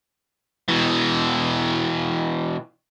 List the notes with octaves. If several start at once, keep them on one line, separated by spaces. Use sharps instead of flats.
B2 E3